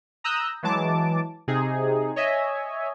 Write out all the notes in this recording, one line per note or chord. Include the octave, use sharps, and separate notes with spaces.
A#5 D#6 E6 F#6 G6
E3 F#3 G#3 A5 D6
C3 D#4 G#4
C#5 D#5 E5 G#5